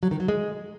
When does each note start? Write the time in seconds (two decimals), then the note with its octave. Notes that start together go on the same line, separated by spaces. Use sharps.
0.03 F#3
0.11 D#3
0.20 F#3
0.28 G#3